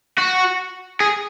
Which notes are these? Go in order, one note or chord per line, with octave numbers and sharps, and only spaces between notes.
F#4
G#4